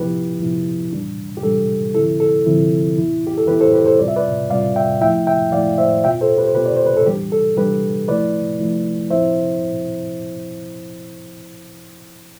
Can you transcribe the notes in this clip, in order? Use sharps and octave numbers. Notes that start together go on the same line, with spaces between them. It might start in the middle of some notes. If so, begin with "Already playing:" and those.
Already playing: C3 F3 B3 E4 G4 B4
C3 F3 B3 E4
E3 G3 D4
G4
E3 G3 D4 A4
D3 F3 C4 E4 A4
A4
D3 F3 C4 E4
E3 B3 E4
G4
A4
E3 B3 E4 G4 B4
A4 C5
G4 B4
A4 C5
C3 G3 C4 F4 D5
E5
B4 D5
C3 G3 C4 F4 D5 F5
E5 G5
F3 A3 E4 E5 G5
E5 G5
F3 A3 E4 D5 F5
C5 E5
B2 B3 F4 E5 G5
A4 C5
G4 B4
C5
B2 B3 F4 G4 B4
D5
C5
B4
A4
E3 G3 D4 G4
A4
E3 G3 D4 G4 B4
F3 A3 E4 B4 D5
F3 A3 E4
F3 C4 E4 C5 E5